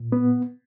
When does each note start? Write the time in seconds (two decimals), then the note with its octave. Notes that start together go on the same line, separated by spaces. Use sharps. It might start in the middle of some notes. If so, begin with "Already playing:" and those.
Already playing: A#2
0.12 B3